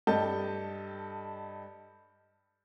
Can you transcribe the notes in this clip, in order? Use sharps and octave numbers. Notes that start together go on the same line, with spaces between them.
G2 G4 A4 D#5 A5 G6